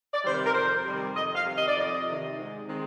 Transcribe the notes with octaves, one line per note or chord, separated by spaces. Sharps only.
D5
C3 D#3 G3 C5
A#4
A#4
F2 C5
C3 D#3 G3
F2 D#5
F5
C3 D#3
D#5
D5
F2 D#5
C3 D#3
G#2
D#3 G#3 C4